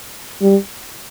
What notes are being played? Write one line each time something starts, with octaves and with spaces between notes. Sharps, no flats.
G3